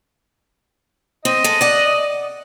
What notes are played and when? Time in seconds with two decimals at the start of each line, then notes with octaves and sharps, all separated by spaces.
1.25 C4 D#5
1.44 G#3 A4
1.61 D5 F#5